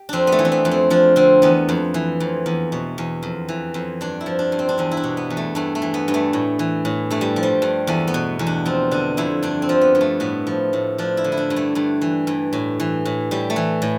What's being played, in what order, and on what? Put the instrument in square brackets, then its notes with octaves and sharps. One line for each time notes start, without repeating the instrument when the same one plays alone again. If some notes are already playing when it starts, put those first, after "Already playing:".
Already playing: [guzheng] G4
F2 C4 D4
B3
A3
E3
C4
B3
F2
C4
F3 D4
D3 C4
E2 B3
F2
E3
F2
E2
B2
E2
F2
E3
F2
G2 D4
E4
F3
D4
G2
C4
D4
E2 C4
E4
D4
B2
B3
E2
A3
G2 A3
A3
E3
B3
G2
A3
A2
E3
A2
G2 A3
G3
F3
G3
G2
E2 A3
B3
B2
E2
D4
F3 C4
D3 D4
F2 E4
G2 D4
C4
F3
B3
G2
A3
A2 B3
F3
A2
F3 D4
E4
D3
E4
D4
G2
A3
G2 A3
E3
G2
A2
E3
A2
A2 G3
A3
E3
A2